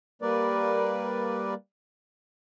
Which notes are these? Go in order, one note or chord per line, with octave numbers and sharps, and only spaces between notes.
G3 A#3 A#4 B4 D5